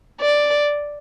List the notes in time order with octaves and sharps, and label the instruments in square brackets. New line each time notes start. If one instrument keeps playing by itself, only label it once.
[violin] D5